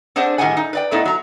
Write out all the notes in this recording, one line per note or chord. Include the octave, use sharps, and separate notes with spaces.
C4 D4 G#4 C5 F#5
A2 D#3 G3 G#4 F#5 G#5
D#4
B4 D5 G5
G#2 A3 B3 D#4 E4
F#3 A#5